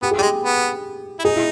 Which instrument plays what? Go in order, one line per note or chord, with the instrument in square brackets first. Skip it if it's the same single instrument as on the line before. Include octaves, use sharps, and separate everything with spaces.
[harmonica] B3 [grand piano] G4
[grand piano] G#4
[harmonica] G3 G#3 [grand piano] G4
[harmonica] B3
E4
[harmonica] D#4 [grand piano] G#4
[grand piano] E4